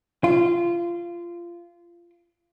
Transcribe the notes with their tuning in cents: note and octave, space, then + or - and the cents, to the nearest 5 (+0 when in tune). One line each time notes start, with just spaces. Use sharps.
F4 -20